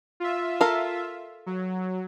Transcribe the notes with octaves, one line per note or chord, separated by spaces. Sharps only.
F4 E5
A4 A#4 F5
F#3